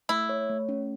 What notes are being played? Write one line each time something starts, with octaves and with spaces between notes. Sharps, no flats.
A3 E4
C#5
A3
C#4